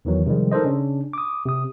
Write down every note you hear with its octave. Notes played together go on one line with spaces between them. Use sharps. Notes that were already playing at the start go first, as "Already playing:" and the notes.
E2 D#3 E3 F#3
C3 D#3 F3 G3 G#3
D#4 A4 A#4 C5 D#5
C#3 C#4 D4
D6 D#6
C3 D#6